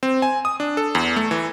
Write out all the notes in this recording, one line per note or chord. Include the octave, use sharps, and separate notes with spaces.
C4
G#5
D#6
D4
A4
E2
A3
E3